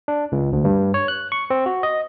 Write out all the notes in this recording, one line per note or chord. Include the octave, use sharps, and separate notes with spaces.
D4
C#2
D2
G2
C#5
F#6
C#6
C4
F#4
D#5